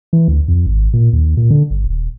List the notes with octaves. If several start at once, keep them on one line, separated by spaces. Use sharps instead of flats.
E3
D2
F2
G#1
A#2
D#2
A#2
D3
G1
D#1